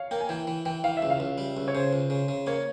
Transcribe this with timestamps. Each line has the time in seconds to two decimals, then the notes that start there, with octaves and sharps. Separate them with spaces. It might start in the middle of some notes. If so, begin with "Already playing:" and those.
Already playing: C#5 F5
0.11 A#3 G5
0.21 G#5
0.29 E3 G5
0.47 E3
0.66 E3 G5
0.84 E3 F5
0.97 E5
1.02 C#2
1.10 F5
1.20 C#2
1.38 G3
1.57 C#2
1.68 C#5
1.74 C#3 C5
1.93 C#2
2.10 C#3
2.28 C#3
2.47 A#3 C#5